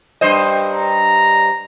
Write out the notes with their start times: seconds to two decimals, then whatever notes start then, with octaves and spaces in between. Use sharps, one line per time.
0.21 G2 C5 D#5
0.74 A#5